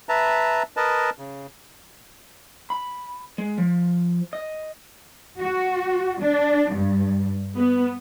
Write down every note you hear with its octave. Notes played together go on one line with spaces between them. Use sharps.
B4 E5 A5 A#5
A#4 B4 D#5 A5
C#3
B5
G#3
F3
D#5
F#4
D4
G2
B3